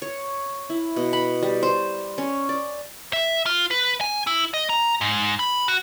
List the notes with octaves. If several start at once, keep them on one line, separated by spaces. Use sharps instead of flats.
C#5
E4
B2
B5
G3
C5
C#4
D5
E5
F4
B4
G#5
E4
D#5
A#5
G#2
B5
F#4